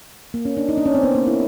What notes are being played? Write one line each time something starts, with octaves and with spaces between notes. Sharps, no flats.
A#3
C#4
D4
D#4
D4
C#4
C4
B3
A#3
E4